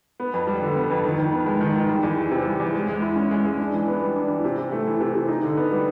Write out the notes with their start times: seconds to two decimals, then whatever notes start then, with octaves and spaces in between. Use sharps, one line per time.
0.20 B3
0.34 F2
0.47 G3
0.62 D3
0.76 B3
0.90 F2
1.05 D#3
1.19 D#3
1.32 B3
1.46 G#3
1.61 D#3
1.76 D#3
1.89 G3
2.03 E2
2.18 E3
2.31 C3
2.46 G3
2.60 E2
2.74 G#3
2.88 G#3
3.02 E4
3.16 C#4
3.31 G#3
3.45 G#3
3.59 D4
3.73 E3
3.87 B3
4.02 G3
4.16 D4
4.29 E3
4.44 C3
4.58 C3
4.72 A3
4.86 E3
5.01 C3
5.15 C3
5.28 D#4
5.43 D3
5.57 B3
5.72 G3